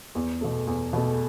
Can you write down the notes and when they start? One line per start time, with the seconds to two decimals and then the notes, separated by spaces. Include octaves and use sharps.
0.15 E2
0.41 B2 A3
0.67 E2
0.93 B2 A3